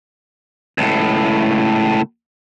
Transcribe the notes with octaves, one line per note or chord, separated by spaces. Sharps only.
C#2 A2